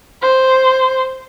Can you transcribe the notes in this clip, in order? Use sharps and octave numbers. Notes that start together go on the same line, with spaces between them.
C5